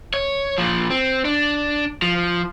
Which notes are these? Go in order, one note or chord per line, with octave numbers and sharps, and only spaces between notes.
C#5
A#2 F3
C4
D4
F3